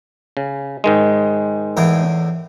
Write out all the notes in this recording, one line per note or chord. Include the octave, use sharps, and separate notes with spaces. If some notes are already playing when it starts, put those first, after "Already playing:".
C#3
G#2 D#3 G#3
E2 A2 A#4